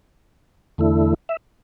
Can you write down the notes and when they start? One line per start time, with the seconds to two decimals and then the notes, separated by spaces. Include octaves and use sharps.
0.78 E2 D3 A3 E4
1.29 E5